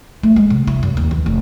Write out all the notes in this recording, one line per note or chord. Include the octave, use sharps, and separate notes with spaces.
A3
G#3
C3
E4
F#2
D#2
E3
F1